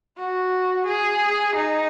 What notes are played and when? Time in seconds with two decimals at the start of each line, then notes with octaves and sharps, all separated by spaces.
0.18 F#4
0.87 G#4
1.56 D#4